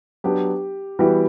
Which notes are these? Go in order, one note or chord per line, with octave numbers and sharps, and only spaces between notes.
F#3 B3 D4 G4
E3 G3 B3 E4 F#4 G4